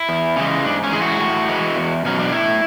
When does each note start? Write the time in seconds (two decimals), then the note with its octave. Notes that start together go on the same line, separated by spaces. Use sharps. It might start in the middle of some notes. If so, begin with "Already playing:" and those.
Already playing: E4
0.09 E2
0.36 C#3 E3 G#3
0.64 G#2 D4
0.84 C#4
0.93 E3 G#3 G#4
1.02 F#4
1.20 A2
1.49 E3 G#3
1.76 E2
2.05 B2 F#3 C#4
2.19 D4
2.32 A2 E4